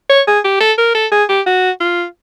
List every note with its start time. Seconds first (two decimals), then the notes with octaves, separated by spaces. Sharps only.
0.10 C#5
0.27 G#4
0.44 G4
0.60 A4
0.78 A#4
0.95 A4
1.12 G#4
1.29 G4
1.47 F#4
1.81 F4